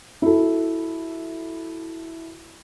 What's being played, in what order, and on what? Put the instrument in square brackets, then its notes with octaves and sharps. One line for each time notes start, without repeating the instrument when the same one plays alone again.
[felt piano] E4 F#4 A4